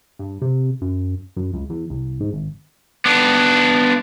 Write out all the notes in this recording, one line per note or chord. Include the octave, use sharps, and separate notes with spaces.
G2
C3
F#2
F#2
C#2
E2
C2
G#2
G#1
B3 D4